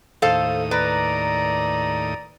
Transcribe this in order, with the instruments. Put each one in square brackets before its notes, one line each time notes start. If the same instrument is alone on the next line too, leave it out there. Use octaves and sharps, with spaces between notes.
[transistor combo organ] D#2 A2 D#6 [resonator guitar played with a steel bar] A4 C5 F5
[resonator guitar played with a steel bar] B4 [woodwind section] D5 A#5